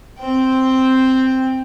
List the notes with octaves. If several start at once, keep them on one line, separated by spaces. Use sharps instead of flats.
C4 G5